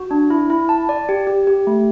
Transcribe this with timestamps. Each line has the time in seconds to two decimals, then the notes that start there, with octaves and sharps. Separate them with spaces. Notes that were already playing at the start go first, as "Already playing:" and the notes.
Already playing: F#4
0.11 D4
0.30 E4
0.50 E4
0.69 A5
0.89 D5
1.09 G4
1.27 G4
1.47 G4
1.67 A3